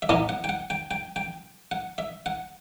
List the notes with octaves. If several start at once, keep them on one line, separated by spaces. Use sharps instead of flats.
E5
A2 E3 B3 D#4 D#5
F#5
G5
F#5
G5
G5
G5
F#5
E5
F#5